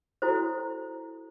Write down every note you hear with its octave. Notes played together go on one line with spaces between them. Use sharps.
E4 F#4 A4 C5